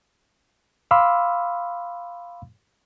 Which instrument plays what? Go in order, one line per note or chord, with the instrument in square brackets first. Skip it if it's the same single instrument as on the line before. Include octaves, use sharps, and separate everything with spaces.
[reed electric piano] F5 B5 C6 D6 E6 F6